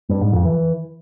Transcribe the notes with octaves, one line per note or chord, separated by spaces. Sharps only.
G2
G#2
F2
E3